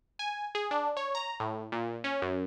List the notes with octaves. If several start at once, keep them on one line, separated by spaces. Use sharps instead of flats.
G#5
G#4
D4
C#5
A#5
A2
A#2
C#4
F#2